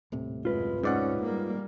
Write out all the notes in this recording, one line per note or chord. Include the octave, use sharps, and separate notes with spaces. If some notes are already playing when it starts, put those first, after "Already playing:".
D#1 A2 C3
F#2 G#3 F4 B4
G#2 C#4 D5 F#5
G3 A#3